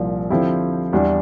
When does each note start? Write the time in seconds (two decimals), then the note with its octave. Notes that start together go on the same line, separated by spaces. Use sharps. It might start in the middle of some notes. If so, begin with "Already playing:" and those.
Already playing: C2 A#2 F3
0.30 D3 F3 C4 E4 G4
0.93 E2 E3 G3 D4